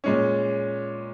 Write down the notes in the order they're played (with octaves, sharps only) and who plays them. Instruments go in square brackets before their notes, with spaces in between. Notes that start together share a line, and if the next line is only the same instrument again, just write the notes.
[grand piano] A#2 G#3 C#4